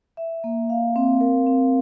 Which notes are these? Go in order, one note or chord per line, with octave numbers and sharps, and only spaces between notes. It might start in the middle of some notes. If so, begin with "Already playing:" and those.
E5
A#3
F5
C4
A#4
C4